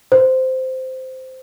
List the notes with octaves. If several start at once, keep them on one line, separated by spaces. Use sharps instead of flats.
C5